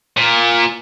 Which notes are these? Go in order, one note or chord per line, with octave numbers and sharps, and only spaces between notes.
A#2